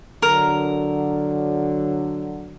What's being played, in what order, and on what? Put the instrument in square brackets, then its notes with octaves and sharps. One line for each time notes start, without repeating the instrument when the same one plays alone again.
[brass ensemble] D3 F#3 [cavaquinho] A#4